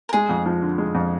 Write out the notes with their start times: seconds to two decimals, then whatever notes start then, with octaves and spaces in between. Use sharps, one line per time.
0.09 A#4
0.13 G#3 G#4
0.29 F2
0.46 F3
0.62 D3
0.78 G#3
0.95 F2